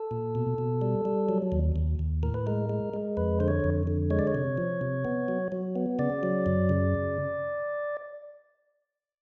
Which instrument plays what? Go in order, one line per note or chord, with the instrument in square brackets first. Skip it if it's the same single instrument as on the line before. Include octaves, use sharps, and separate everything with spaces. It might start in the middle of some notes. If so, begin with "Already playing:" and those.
Already playing: [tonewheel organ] A4
A#2
B2
B2
G3
G3
F#3
D#2
D#2
D#2
A2 A#4
B4
G#3 A#4
G#3
G#3
F2 B4
D3 C5
C#5
F2
D3
G#3 C#5
D5
C#5
C3
F3
C3
B3
F#3
F#3
B3
C#3 D5
F#3
F#2
C#3